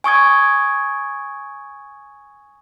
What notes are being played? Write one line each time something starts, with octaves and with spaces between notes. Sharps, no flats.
G#5 C#6 D#6 G#6